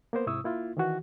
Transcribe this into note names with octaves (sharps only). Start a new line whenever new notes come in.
A#3 B3 A#4 C5
G#2 C3 E4 C#6 D#6 E6
A#3 E4 F4
D#3 E3 F#4